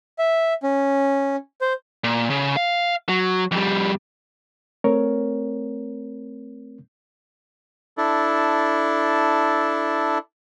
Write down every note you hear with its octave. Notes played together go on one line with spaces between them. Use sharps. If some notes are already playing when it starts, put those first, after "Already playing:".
E5
C#4
C5
A#2
C#3
F5
F#3
F2 G3
A3 C4 A#4 C#5
D4 E4 A4